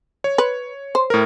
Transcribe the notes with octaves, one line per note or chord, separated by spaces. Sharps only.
C#5
B4
C5
A2 A#4